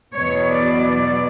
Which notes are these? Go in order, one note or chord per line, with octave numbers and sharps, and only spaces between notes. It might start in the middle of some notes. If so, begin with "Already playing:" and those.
E2 B2 F#3 C#5
D5
D5